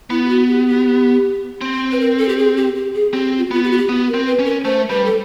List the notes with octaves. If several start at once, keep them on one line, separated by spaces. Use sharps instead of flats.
B3 E4
G4
F#4
G4
G4
C4
B4
A#4
A4
G4
G#4
G4
G4
G#4
C4 G4
F4
F#4
B3 F4
G4
F#4
G4
B3
A#4
C4
B4
C#4
A#4
A3 C5
G3 B4
A4